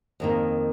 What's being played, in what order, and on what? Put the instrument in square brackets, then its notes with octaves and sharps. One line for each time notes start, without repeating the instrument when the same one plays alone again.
[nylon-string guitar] F2 D#3 A#3